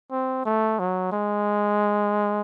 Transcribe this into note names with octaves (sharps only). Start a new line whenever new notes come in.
C4
A3
F#3
G#3